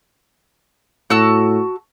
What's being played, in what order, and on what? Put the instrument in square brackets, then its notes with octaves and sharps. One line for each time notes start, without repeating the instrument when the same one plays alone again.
[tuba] A2 [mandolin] F#4 A5 E6